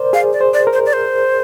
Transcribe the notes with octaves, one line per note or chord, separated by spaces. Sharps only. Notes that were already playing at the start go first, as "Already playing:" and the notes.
Already playing: A#4 C5 D5
G#4 F5
D5
C5
D5
A#4
C5
D5
C5